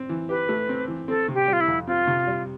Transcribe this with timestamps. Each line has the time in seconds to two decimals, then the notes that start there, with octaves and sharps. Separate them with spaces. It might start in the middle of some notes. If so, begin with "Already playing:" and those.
Already playing: C4
0.09 E3
0.29 G4 B4
0.49 A3
0.69 C4
0.88 E3
1.08 C4 A4
1.28 C3
1.34 G4
1.47 G3
1.53 F4
1.61 E4
1.68 F2
1.87 C4 F4
2.07 C3
2.27 G3